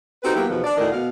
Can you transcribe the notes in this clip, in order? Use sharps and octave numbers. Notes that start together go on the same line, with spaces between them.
C4 D#4 F#4 G4 A4 B4
F#3 A#3 B3 E4 G4
E2 B2 D#3 F3 B3
D4 D5
D2 A2 D#3 A#4 D5 D#5
B2 F5